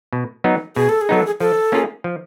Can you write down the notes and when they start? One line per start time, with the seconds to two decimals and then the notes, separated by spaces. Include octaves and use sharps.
0.13 B2
0.44 F#3 B3 D#4
0.76 B2 G#4
0.89 A4
1.01 G#4
1.09 F#3 B3 D#4 A4
1.26 G#4
1.40 F3 A4
1.72 A#3 C#4 F4 G#4
2.04 F3